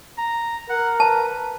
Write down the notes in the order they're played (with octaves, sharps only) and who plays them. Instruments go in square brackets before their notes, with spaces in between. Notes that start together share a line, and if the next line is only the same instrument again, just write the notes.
[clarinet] A#5
[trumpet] A#4 [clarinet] F#5
[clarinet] B4 [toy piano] A5